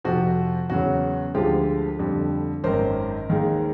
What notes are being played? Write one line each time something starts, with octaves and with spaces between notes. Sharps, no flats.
F2 C3 F3 F#4
E2 C#3 F#3 F#4
D2 D3 F3 G#3 F4 G4
F2 D3 G3
G#1 F#2 D#3 A#4 C5
D#2 D#3 G#3